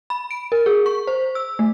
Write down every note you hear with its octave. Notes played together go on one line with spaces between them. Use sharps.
B5
D7
A#4
G#4
C#6
C5
E6
A3